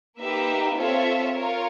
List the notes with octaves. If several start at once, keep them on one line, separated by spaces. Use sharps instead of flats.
A#3 D#4 G4 B4 E5
C4 F4 A4 C#5 E5
F4 A#4 C#5